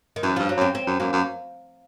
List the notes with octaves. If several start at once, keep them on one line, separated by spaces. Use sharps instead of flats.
D#3
F#2 E3
G2 F3
F#3
F#2 C4
C4
F#2
F#2 A#3
F#2